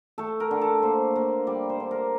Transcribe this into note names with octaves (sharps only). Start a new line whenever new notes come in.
A3 A4
A#4
D3
A4
A#3 C5
A#3
G3 D5
C5
D3
A#4